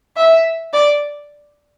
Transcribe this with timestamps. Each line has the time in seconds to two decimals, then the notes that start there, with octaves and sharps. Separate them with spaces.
0.17 E5
0.73 D5